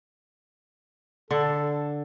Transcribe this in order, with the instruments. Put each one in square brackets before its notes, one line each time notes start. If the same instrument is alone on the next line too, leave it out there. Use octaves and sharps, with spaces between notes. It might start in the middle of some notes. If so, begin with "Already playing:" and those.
[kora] D3 [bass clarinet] A4